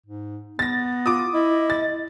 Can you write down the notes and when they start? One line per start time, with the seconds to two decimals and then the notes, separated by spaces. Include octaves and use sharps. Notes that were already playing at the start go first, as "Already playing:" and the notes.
0.07 G#2
0.59 B3 A6 A#6
1.06 F4 D6 D#6
1.33 E4 D#5
1.70 A6